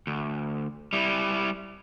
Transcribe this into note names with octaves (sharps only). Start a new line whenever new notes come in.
D2
G3 E4